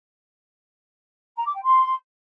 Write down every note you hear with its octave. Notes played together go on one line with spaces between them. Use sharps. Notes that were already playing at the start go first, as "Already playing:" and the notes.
A#5
D6
G5
C6